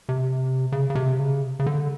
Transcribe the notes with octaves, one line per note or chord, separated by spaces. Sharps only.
C3
C#3
C#3
C3
C#3
C#3
D3